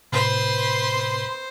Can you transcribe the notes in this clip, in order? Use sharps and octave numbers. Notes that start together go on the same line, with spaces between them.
A2 C3 B4 C5 C6